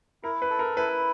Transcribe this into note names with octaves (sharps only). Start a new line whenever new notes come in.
E4 A#4
B4
A4
A#4
E4 B4